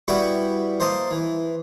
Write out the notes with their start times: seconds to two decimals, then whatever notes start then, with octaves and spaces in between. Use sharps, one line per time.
0.08 G3 B3 E4 F#4 B4
0.80 A#3 C5 D#5 A5
1.11 E3